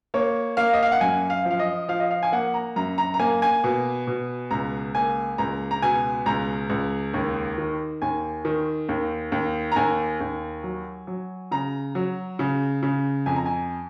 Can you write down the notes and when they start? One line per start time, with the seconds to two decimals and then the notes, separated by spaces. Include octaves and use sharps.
0.14 A#3 C#5
0.57 A#3 F5
0.73 D#5
0.83 F5
0.92 F#5
1.01 F#2 G#5
1.30 F5
1.45 F3
1.51 F5
1.59 D#5
1.88 F3 F5
2.00 D#5
2.11 F5
2.23 G#5
2.32 A#3 F#5
2.54 A#5
2.76 F#2 A#5
2.98 A#5
3.14 A#5
3.19 A#3 G#5
3.42 G#5
3.64 B2
4.07 B2
4.51 C#2 A#5
4.95 A#3 G#5
5.38 C#2 A#5
5.71 A#5
5.82 B2 G#5
6.26 C#2 A#5
6.70 C#2
7.14 D#2
7.58 D#3
8.02 D#2 G#5
8.45 D#3
8.89 D#2
9.32 D#2
9.72 A#5
9.76 D#2 G#5
10.20 D#2
10.63 F#3
11.07 F#3
11.51 C#3 A#5
11.95 F#3
12.39 C#3
12.83 C#3
13.26 F2 G#5
13.36 A#5
13.46 G#5